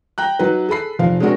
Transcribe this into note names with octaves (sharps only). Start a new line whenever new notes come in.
G5 A#5 F#6
F#3 D#4 B4
G#4 A4 B5 C7
F1 F3 F5
G#3 A3 C4 D4 F#4 A#4